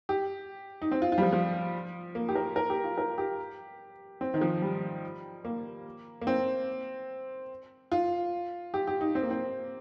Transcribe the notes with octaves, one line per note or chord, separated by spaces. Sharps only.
G4
D#4
C4
F4
F4
G3
F3
F3
A#3
G4
A#4
A#4
G4
F4
A#4
G4
C4
D#3
F3
G3
A#3
A#3
C4
F4
G4
G4
D#4
C4
A#3
C4